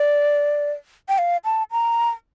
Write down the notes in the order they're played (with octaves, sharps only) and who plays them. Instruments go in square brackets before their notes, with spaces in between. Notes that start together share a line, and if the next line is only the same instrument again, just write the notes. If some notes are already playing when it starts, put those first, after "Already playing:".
Already playing: [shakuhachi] D5
G5
F5
A5
A#5